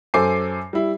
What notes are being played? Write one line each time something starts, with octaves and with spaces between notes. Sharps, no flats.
F#2 A4 C5 G#5 D6 C7
G3 E4